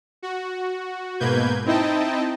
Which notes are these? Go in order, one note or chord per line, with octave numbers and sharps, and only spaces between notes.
F#4
G#2 B2 A#3 B4 G6 G#6
C4 D#4 E4 D#5 G5 A5